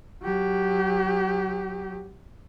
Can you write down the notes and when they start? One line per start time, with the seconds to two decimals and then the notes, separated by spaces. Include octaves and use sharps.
0.22 F#3 G4